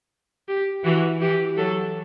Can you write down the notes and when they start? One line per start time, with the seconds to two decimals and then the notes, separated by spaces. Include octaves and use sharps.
0.49 G4
0.85 E3 F#4
1.21 E3 G4
1.58 F#3 A4